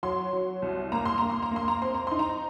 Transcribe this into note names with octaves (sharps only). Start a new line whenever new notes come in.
F#3 C6
F#3
C2
A#3 A#5
C6
A#3 A#5
C6
A#5
A#3 C6
A#5
C4 C6
A#5
D#4 C6
A#5